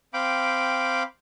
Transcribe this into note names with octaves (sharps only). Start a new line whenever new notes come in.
C4 F5 G5 B5 D6